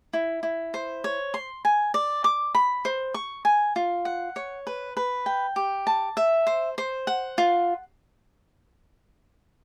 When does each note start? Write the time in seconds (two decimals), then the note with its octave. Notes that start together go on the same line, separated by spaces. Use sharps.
0.13 E4
0.43 E4
0.74 C5
1.04 C#5
1.34 C6
1.65 G#5
1.94 D5
2.24 D6
2.55 B5
2.85 C5
3.14 C#6
3.45 G#5
3.76 F4
4.05 F#5
4.36 C#5
4.67 B4
4.97 B4
5.26 G5
5.56 G4
5.87 A5
6.17 E5
6.47 C5
6.78 C5
7.07 F#5
7.38 F4